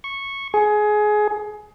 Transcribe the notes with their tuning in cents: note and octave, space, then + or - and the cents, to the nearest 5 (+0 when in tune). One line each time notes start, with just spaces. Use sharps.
C#6 -10
G#4 +20